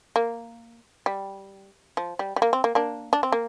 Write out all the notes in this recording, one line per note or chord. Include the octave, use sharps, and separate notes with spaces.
A#3
G3
F3
G3
G3
A#3
C4
A#3
A#3 D4
D4
C4
A#3